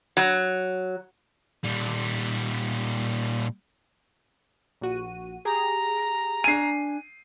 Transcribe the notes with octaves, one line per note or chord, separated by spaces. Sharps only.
F#3
A#2 G3
A#1 F#4 D#7
G4 G#4 A#5
D4 G#5 C7 D#7